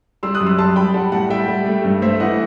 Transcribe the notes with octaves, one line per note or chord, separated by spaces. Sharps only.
G3 C6 E6
D#6 F#6
F#2
C6 E6
G3 A5 C6
G3 G5 B5
G3 F#5 A5
A2 F#5 A5
G3 E5 G5
G3
A3
G2
A3 C5 E5
E3 D#5 F#5